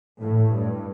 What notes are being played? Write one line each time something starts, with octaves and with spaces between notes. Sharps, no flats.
A2
G2